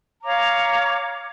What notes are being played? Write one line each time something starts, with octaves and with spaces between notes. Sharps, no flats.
C#5 F5 A#5 D6